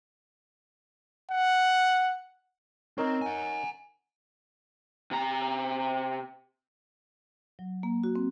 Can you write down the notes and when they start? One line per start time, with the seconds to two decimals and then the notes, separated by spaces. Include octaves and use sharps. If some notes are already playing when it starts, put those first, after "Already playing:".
1.31 F#5
2.98 C4 D#4 A#4 C#5
3.22 F#5 G#5
5.11 C3 A#5
7.59 F#3
7.83 A#3
8.04 F#4
8.16 C4